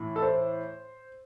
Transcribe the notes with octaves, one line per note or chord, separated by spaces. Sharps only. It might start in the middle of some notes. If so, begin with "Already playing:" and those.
Already playing: A2 E3
A4
C5